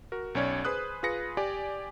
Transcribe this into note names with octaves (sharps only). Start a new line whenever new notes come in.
F#4 A#4
B1 C#4 C#5 D5 G#6
G#4 B4 C5 D#6 F#6
F4 G#4 B4 A#6 C#7
G4 D5 G#5